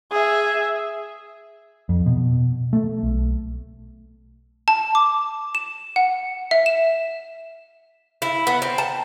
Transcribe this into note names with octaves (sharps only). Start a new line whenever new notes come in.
G#4 E5
F2
B2
A3
B1
A5
D6
E7
F#5
E5
E7
E4
B3
C4
A5